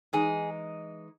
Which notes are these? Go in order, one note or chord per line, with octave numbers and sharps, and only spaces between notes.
E3 G#3 D#4 G#4